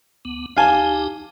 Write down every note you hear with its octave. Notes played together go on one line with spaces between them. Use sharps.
D2 B3
D2 D#4 G4 F5 G#5 A5